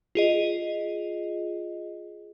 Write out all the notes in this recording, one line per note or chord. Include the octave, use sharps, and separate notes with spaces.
F4 G#4 D#5